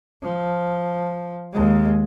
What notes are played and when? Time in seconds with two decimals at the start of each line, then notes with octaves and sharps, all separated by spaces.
0.22 F3
1.52 D#2 G#3